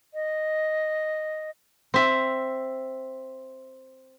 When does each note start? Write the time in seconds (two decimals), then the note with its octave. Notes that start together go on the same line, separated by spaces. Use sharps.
0.14 D#5
1.94 C4 E5